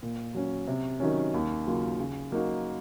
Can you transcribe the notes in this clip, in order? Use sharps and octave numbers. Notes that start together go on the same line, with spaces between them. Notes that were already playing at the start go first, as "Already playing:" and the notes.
A#2
F#3 C#4
C3
D#3 F#3 C#4
D#2
C#3 F#3 A#3 F4
C#3
F#3 A#3 D#4 F#4